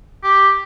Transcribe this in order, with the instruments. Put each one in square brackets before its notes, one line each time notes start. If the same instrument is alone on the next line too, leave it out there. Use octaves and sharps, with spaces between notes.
[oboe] G4